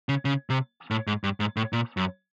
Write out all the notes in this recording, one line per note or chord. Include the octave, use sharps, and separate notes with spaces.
C#3
C#3
C3
A2
G#2
G2
G#2
A2
A#2
F#2